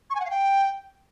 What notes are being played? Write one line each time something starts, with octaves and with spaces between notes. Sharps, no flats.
C#6
G#5
F#5
F5
G5